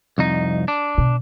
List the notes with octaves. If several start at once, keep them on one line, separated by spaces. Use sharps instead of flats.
C2 F2 D#4
D4
B2